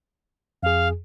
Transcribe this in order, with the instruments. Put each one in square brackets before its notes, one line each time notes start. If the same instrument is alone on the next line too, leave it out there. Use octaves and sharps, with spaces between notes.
[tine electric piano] F2 G#4 [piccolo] F5